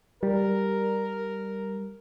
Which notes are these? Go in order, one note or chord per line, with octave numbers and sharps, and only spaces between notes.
G3 A#4